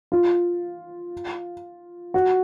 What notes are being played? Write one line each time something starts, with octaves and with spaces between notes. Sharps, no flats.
F4
F#4